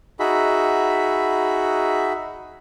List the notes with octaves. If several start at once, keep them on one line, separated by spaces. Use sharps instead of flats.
D#4 F#4 G#4 E5 B5